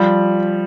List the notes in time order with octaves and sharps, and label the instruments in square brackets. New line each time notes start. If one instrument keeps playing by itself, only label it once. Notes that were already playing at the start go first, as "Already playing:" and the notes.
Already playing: [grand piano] F3 G3